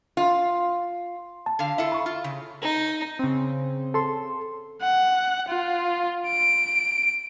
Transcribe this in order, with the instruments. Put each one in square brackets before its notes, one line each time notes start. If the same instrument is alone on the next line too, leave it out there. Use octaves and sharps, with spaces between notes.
[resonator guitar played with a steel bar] F4
[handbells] A5
[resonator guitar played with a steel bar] D3 F5
[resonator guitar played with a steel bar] E4 F4 A4 [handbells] E5
[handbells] B5 C#6
[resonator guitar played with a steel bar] F4
C#3
[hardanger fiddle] D#4
[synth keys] C#3 C4
[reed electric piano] A4 C6
[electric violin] F#5
F4
D7